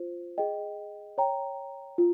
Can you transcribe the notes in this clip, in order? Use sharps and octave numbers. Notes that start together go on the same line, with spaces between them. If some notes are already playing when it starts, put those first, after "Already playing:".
Already playing: F4 C5
G#4 D#5 G5
C#5 G5 A#5
F4